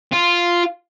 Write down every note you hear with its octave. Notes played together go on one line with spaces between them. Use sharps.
F4